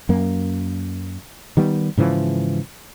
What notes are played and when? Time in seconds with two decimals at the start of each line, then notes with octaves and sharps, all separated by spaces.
0.09 F#2 A#3
1.57 D#3 G3 B3
1.97 G#2 C#3 E3 F3